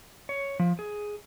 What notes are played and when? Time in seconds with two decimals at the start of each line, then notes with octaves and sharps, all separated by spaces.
0.29 C#5
0.59 F3
0.79 G#4